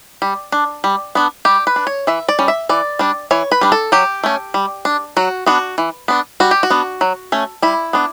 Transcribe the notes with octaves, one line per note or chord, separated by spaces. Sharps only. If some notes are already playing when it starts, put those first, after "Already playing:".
G3
D4
G3
B3 D4
G3 G4
B4
D4
C#5
E3 E5
D5
G3 C#4
E5
E3 D5
G3 D4
E3 C#5
B4
G3 D4
A4
F#3 G4
A3 C#4
G3
D4
F#3 F#4
B3 D4 F#4
E3
B3 D4
G3 F#4
G4
F#4
B3 D4
F#3
A3 C#4
G3 E4
B3 D4